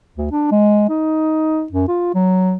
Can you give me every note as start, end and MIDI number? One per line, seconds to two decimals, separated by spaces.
0.17 0.28 38
0.32 0.48 62
0.52 0.88 56
0.89 1.65 63
1.72 1.87 42
1.88 2.10 65
2.14 2.57 54